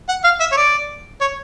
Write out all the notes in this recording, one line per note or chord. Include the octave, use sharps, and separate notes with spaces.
F#5
F5
E5
C#5
D5
C#5